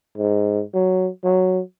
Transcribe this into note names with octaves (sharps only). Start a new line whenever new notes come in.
G#2
F#3
F#3